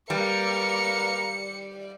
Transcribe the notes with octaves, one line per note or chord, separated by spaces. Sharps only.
G3 A#4 B4 F5 C#7